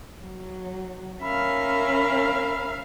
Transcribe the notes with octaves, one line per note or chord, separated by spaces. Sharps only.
F#3
C#4 A#4 E5 F5 B5